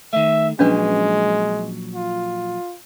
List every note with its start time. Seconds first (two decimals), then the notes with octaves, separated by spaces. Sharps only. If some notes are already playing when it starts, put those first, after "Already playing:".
0.13 D#3 A3 E5
0.59 A#2 F3 F#3 G#3 C#4 D4 B4
1.95 F4